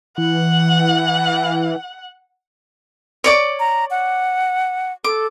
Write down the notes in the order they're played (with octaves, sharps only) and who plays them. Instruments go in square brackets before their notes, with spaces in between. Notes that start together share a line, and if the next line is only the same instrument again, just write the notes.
[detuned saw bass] E3 [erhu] F#5
[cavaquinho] C#5 D5 D6
[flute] A#5
F#5
[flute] A4 [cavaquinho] D6